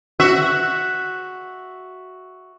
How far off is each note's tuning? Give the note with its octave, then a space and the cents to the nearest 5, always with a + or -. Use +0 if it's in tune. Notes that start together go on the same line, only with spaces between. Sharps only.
F#4 +0 E5 +0